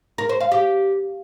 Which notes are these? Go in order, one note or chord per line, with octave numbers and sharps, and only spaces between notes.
A#4
C5
F5
G4